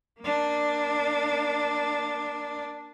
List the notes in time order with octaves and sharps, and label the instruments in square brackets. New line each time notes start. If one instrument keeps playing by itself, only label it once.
[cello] A#3 D4